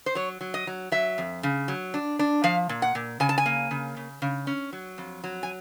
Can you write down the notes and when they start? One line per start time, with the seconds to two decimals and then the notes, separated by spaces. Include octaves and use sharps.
0.06 C5
0.15 F#3 C#5
0.41 F#3
0.54 D#5
0.67 F#3
0.92 F#3 E5
1.18 F2
1.43 C#3
1.68 F#3
1.94 D4
2.19 D4
2.44 F3 F5
2.69 A#2
2.82 F#5
2.95 A#2
3.20 C#3 G#5
3.29 A5
3.38 G#5
3.46 A#3
3.71 C#3
3.97 C#3
4.22 C#3
4.47 C#4
4.73 F#3
4.98 F2
5.24 F#3
5.43 G#5